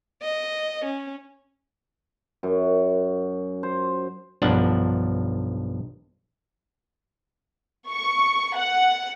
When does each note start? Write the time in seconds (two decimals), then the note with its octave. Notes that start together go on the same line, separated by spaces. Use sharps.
0.22 D#5
0.85 C#4
2.43 F#2
3.63 C5
4.42 B1 G2 F3 D4 F#5
7.91 C#6
8.56 F#5